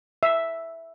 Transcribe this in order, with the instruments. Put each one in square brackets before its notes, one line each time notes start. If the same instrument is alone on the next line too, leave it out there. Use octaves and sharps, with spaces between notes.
[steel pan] E5